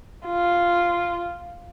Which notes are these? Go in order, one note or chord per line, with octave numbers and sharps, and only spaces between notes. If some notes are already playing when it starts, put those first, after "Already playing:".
F4